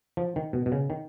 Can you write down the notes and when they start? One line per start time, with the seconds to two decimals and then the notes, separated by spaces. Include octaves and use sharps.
0.17 F3
0.36 D#3
0.53 B2
0.66 B2
0.72 C#3
0.90 D#3